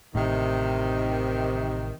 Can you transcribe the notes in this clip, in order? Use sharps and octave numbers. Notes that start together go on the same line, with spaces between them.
A1 A2 C3 D#3